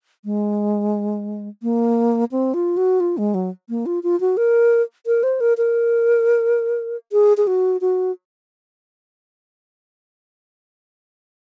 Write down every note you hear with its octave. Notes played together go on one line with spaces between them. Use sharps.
G#3
A#3
C4
F4
F#4
F4
G#3
F#3
A#3
F4
F4
F#4
A#4
A#4
C5
A#4
A#4
G#4
G#4
F#4
F#4